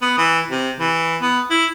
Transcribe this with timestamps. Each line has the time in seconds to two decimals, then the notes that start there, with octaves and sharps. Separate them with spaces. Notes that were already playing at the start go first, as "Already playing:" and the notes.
0.01 B3
0.18 E3
0.50 C3
0.80 E3
1.22 B3
1.50 E4